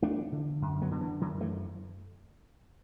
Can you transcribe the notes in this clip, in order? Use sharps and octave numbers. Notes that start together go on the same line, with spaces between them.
E2 A3 D4
D3
F#2
F#3 B3
D3
E3
F#2 D3 F#3
E3 A3